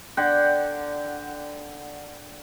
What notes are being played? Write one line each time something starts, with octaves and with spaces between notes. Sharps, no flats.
D3 F#5 G5